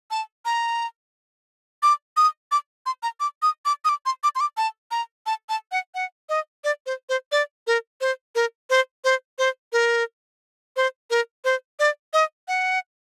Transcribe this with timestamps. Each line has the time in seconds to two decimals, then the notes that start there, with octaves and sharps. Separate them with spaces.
0.11 A5
0.45 A#5
1.83 D6
2.17 D#6
2.52 D6
2.86 C6
3.03 A#5
3.20 D6
3.42 D#6
3.65 D6
3.85 D#6
3.89 D6
4.06 C6
4.24 D6
4.35 C6
4.40 D6
4.57 A5
4.91 A#5
5.26 A5
5.49 A5
5.72 F#5
5.95 F#5
6.29 D#5
6.64 D5
6.86 C5
7.09 C5
7.32 D5
7.67 A#4
8.01 C5
8.35 A#4
8.70 C5
9.04 C5
9.38 C5
9.73 A#4
10.76 C5
11.10 A#4
11.45 C5
11.79 D5
12.13 D#5
12.48 F#5